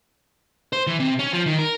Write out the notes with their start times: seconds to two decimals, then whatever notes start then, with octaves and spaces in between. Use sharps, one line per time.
0.73 C5
0.87 E3
1.00 C3
1.19 C#4
1.33 F3
1.46 D#3
1.59 A#4